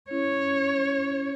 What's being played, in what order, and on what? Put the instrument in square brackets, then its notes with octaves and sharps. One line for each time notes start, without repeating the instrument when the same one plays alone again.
[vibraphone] C#4 E4 [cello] C#5